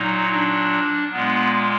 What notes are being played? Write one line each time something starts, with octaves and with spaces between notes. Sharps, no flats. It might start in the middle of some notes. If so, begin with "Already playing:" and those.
Already playing: A#2 F#3 D#4
D4
A#2 G#3 B3